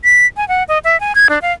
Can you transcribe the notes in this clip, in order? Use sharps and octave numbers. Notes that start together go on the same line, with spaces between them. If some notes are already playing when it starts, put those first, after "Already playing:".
B6
G#5
F#5
D#5
E5
G#5
G#6
D4
F5